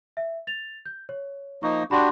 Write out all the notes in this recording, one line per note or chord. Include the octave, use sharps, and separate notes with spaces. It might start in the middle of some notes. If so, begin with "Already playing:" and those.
E5
A6 F7
G6
C#5
F3 A#3 D#4 C#6
D4 F#4 G4 B5 C6